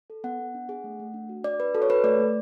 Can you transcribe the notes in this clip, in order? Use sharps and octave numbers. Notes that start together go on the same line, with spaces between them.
A4
B3 F#5
B3
D4
G#4
A3
A3
D4
F#4
D4 D5
D4 B4
F#4 A4
C#5
A4 B4
A3 D5
A3